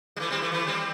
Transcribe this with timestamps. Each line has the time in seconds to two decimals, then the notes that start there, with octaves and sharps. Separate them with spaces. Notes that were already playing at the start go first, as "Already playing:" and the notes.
0.16 G3
0.20 E3 A3
0.30 G3 C4
0.42 E3 A3
0.52 E3 A3
0.67 G3 C4